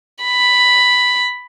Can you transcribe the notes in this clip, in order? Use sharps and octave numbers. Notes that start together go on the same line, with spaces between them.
B5